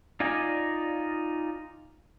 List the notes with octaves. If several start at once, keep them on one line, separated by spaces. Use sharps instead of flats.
D#4 F4 D5 D#5 G#5